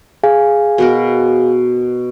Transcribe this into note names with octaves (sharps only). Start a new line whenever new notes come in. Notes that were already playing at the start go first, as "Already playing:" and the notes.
G#4 F5 G#5
B2 B3 A#4